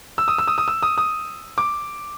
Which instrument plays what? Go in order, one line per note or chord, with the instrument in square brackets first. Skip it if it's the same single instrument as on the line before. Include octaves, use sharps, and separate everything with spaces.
[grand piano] E6
D#6
E6
D#6
D#6
E6
D#6
D#6
D6